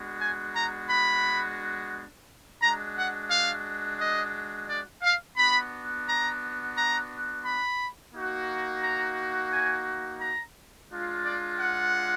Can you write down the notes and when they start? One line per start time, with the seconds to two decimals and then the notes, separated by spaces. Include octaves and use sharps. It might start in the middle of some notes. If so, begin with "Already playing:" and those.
Already playing: G#3 B3 D4 F#4
0.20 G#5
0.54 A#5
0.90 B5
2.61 G#3 D4 F#4 A#5
2.96 F#5
3.30 F5
4.00 D#5
4.69 D5
5.03 F5
5.37 B3 D4 F#4 B5
6.07 A#5
6.75 A#5
7.45 B5
8.14 A#3 D#4 F#4
8.82 A#5
9.52 G#5
10.21 A#5
10.90 G#3 D4 F4
11.25 D5
11.60 F#5